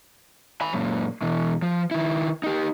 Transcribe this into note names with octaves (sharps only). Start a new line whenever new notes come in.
G#5 B5
F#2 A#2
B2 E3
F3
D#3 E4
D#4 G4